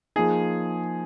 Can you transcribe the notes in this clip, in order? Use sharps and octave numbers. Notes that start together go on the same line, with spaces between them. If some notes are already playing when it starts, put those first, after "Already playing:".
F3 A#3 D#4 G#4